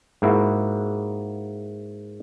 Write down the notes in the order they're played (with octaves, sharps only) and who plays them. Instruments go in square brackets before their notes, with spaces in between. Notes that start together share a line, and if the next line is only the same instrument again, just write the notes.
[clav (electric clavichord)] G#2 A#3 E4 F#4